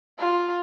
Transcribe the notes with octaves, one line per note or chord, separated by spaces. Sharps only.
F4